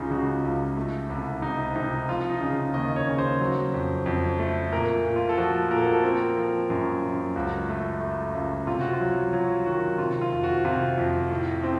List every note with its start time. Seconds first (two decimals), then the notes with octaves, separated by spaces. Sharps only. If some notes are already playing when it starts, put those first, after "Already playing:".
Already playing: C#2 C#3 D#4 F4
0.11 C#3 F#4
0.43 C#2
0.77 A3
1.10 C2
1.42 C3 D#4
1.75 C3 D#4
2.09 F3 F4
2.30 D#4
2.41 C#3
2.74 D#2 D#5
2.96 C#5
3.07 C#3
3.18 C5
3.40 F#3
3.74 F2
4.06 F2
4.39 A3
4.72 A#2 A#4
5.05 A#2
5.16 F4
5.29 A4
5.37 F3 F#4
5.71 A#2 A#4
5.78 A4
5.86 F#4
5.92 A4
6.03 C4 A#4
6.37 F3
6.70 F#2
7.02 F#2
7.36 C#2 F#4
7.68 A3
8.01 A3
8.35 C#2
8.67 C3 F4
8.81 F#4
8.93 F4
9.00 F#3
9.33 F#3 F4
9.66 D#3 F#4
9.98 C3 F4
10.21 F4
10.32 F2
10.44 F#4
10.65 C3 F4
10.97 F2
11.30 A2
11.64 C4